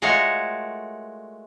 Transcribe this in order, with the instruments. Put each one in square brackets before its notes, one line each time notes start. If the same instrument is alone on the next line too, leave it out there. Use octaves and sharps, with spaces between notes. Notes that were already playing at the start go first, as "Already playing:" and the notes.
[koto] G#3 A3 F4 F#4 A#4 C#5